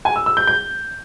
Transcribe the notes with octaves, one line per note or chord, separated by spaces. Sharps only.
G#5
E6
E6
G6
G6